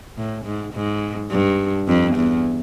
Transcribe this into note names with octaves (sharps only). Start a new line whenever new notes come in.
A2
G#2
G#2
G2
F2
E2